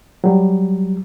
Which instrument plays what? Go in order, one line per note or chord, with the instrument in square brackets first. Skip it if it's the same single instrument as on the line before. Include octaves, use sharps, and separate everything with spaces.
[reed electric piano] F#3 G3